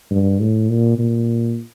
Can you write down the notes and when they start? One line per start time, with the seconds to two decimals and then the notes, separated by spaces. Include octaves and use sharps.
0.11 G2
0.40 A2
0.69 A#2
0.99 A#2